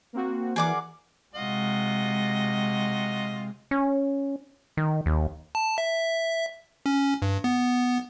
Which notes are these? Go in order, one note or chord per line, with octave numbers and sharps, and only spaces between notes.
A#3 C4 F#4
E3 G#4 A#4 D5 F#5 D6
C3 G#3 F4 F#4 D#5
C#4
D#3
D#2
A5
E5
C#4
G2
B3